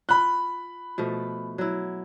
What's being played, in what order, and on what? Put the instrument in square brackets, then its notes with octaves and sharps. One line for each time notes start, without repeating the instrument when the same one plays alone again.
[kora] F4 [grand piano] B5 F#6
[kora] B2 F3 A3
F#3 E4